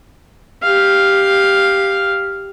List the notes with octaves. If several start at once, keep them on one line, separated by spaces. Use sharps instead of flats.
G4 F5